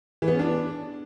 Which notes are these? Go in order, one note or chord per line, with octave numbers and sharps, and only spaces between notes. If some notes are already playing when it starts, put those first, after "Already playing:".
E3
B3
C#4
D4